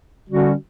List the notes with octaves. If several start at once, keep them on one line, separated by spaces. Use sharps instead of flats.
D3 G3 C#4 F#4